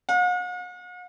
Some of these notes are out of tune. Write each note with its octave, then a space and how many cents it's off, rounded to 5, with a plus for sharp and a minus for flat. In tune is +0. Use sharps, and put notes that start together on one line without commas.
F#5 -45